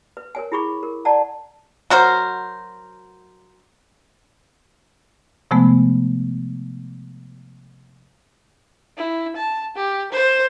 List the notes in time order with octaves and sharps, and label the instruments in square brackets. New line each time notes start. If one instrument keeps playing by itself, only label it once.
[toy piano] B4
A#4 C#5 G#5
E4 G#4 B5 C#6 D6
A#4
D5 F#5 A5 A#5
[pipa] F#3 F#4 A#4 C5
[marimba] C3 F3 G#3 A3 B3
[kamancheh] E4
A5
G4
C5